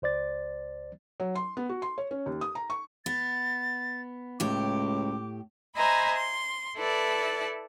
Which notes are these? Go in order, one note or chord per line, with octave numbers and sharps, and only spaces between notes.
C#2 C5 D5 A6
F#3
C6
B3
F#4
C6
C#5
C#4
D#2
D#6
A#5
C#6
B3 A6
C#2 A2 G4 D6
C5 D#5 E5 G#5 A#5 B5
C6
E4 A4 B4 D5 A5